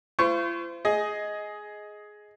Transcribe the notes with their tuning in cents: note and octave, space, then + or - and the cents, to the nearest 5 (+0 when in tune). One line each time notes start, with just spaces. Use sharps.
F4 -45 C5 -30 C#6 +0
G#4 +10 D#5 +10